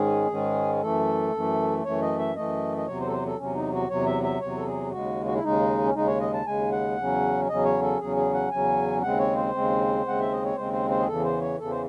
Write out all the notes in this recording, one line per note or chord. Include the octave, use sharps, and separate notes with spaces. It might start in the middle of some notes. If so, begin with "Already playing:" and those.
Already playing: G#2 D#3 G#3 C#4 G#4
G#2 D#3 G#3 C#4
F#2 E3 A3 A4
F#2 E3 A3
F#2 E3 A3 C#5
D#5
E5
F#2 E3 A3 D#5
D#5
E2 C3 F#3 C#5
C5
A4
C5
A4
E2 C3 F#3 C#4
D#4
F#4
E2 C3 F#3 C#5
E5
E5
E2 C3 F#3 C#5
A4
G#4
D#2 C#3 G#3 F#4
F#4
E4
D#2 C#3 G#3 D#4
C#4
D#2 C#3 G#3 D#4
C#5
D#5
A5
D#2 C#3 G#3 G#5
F#5
E2 C#3 F#3 C#4
E2 C#3 F#3 C#4 D#5
C#5
A4
E2 C#3 F#3 C#4 G#4
G#4
F#5
E2 C#3 F#3 C#4 G#5
D#2 C#3 G#3 C4 F#5
C#5
C5
D#2 C#3 G#3 C4
D#2 C#3 G#3 C4 F#5
E5
D#5
C#5
D#2 C#3 G#3 C4 C5
C5
C5
G#4
E2 C#3 E3 A4
C5
C#5
E2 C#3 E3 A4
C5